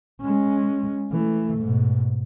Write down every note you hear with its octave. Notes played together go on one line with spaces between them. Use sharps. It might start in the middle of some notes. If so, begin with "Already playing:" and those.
G#3 C#4
E3 A3
G#2 B2